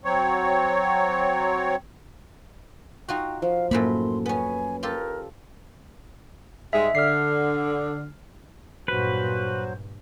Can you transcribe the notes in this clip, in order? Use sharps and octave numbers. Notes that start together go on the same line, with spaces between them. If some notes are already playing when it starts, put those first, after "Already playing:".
F#3 C4 C#5
D#4 F4 F#4 G5 C6
F3 F5
F#2 A2 A#3 B5 C6
B3 C#4 G#5
F4 G4 A4 A#4
G#2 G3 G#3 E5
D3 F6 C7
G2 A#2 F#3 F#4 B4 C5